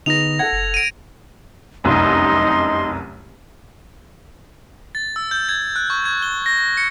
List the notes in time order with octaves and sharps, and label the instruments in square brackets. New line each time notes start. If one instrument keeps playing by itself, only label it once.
[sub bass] D3 [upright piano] B3 D#4 G#4 [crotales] A#6 F7
[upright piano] A4 F#5 [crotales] G#6
[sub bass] F#1
[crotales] D7 D#7
[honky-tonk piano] F1 C2 F#2 [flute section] D#4 D#5 C6
[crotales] A6
E6
G6
G#6
F#6
C#6
G#6
G7
A#6
C#7